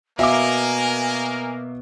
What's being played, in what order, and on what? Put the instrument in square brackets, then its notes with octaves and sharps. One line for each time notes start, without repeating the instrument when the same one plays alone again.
[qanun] B2 [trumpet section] A#3 A#4 [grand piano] E5 F5 D6 [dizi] G#5